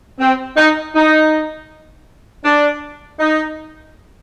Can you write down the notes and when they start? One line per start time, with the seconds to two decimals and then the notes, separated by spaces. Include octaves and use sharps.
0.20 C4
0.57 D#4
0.95 D#4
2.44 D4
3.19 D#4